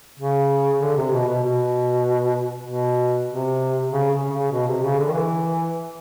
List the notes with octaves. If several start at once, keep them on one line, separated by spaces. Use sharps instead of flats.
C#3
D3
C3
B2
B2
B2
B2
C3
C#3
C#3
C#3
B2
C3
C#3
D3
D#3
E3